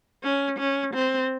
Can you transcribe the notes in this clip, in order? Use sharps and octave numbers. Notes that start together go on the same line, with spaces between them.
C#4
C#4
C4